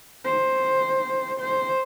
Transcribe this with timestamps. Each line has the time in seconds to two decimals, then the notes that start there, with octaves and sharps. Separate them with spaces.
0.25 C5
1.39 C5